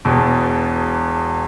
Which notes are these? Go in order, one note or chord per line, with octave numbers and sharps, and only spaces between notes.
E1 E2 B2